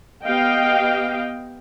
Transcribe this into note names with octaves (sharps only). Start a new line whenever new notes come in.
B3 G4 D#5 F5 G5